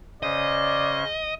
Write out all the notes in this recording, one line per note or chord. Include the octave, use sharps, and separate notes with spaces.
C#3 C#4 C5 D5 D#5